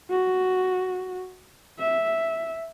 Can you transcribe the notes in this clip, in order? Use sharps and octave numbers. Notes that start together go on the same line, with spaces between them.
F#4
E5